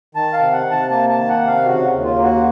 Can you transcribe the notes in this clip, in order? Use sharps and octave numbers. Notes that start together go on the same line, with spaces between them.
D#3 A5
F5
C3
F#5
C3
A5
A#3 A5
A5
D#3
F#5
C3
F5
C#3 F#4
D#2
F4
A#3
F#4